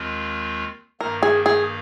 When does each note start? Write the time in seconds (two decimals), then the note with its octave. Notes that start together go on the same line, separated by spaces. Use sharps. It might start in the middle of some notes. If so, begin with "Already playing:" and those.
Already playing: D#2 D#3 G#3 C4 F4
1.00 G2 D#3 A#3 A#4
1.23 G#4
1.46 G#4